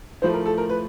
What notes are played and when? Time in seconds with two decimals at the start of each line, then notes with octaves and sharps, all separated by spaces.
0.22 A2 F3 A3 C5
0.34 A#4
0.46 A4
0.58 A#4
0.69 B4